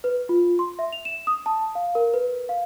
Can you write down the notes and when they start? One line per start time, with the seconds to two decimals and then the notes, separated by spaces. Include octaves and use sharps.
0.04 B4
0.29 F4
0.59 C6
0.79 E5
0.93 F7
1.05 E7
1.27 D#6
1.46 A5
1.75 F5
1.95 A#4
2.14 B4
2.49 F5